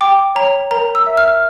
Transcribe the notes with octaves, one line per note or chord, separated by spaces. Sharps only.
G5 D6
C#5 A#5
A#4 A#5
E6
E5
F6